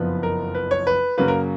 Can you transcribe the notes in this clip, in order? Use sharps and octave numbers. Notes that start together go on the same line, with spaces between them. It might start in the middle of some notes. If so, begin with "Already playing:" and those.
Already playing: F#1 F2 F3 B3 B4
A#4
B4
C#5
B4
F#2 C#3 F#3 A#3 B4
A#4